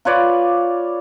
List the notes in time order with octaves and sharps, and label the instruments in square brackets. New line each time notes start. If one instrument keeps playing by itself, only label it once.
[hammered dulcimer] F4 B4 C#5 D5